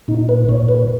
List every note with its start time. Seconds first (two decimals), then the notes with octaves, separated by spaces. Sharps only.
0.08 A#2 D#4
0.29 B4
0.49 A#2 C#5
0.69 B4